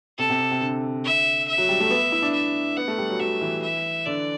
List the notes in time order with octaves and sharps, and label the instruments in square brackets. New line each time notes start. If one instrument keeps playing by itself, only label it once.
[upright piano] C3 [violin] A4
[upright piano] C3
C3
C3
D3
[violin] E5
E5
[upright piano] F#3
G3
A3
B3
E4
D4
[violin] E5
[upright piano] B3 [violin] F#5
[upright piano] A3
G3
F#3
[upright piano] F#3 [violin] E5
[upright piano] E3
[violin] E5
[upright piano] D3 [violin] D5